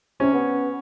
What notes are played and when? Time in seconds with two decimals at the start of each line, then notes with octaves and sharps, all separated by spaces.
0.20 C3 C#4
0.34 B3